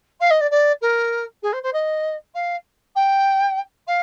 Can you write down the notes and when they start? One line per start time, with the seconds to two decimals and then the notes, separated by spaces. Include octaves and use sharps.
0.20 F5
0.30 D#5
0.40 D5
0.50 D5
0.81 A#4
1.42 G#4
1.52 C5
1.63 C5
1.73 D#5
2.34 F5
2.95 G5
3.87 F5